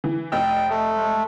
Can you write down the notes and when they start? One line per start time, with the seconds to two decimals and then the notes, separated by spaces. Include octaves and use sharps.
0.04 E3
0.32 F1 D#5 G5 E6
0.70 A3
0.95 G#3